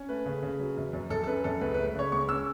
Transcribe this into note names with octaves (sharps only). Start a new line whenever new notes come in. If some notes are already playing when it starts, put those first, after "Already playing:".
Already playing: C#4
A3 B4
C#3
C#3
F#3
F#2
F#2
F#2 A4
A4
C#4 B4
F#2 A4
C#2 B4
B4
A3
B4
C#3 C#5
C#2 C#6
C#4 E6